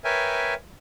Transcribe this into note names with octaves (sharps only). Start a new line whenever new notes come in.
A#4 B4 C#5 E5 G5 G#5